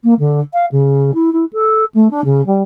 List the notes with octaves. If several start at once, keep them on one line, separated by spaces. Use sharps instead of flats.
A#3
D3
F5
C#3
E4
E4
A4
A3
D4
C#3
G3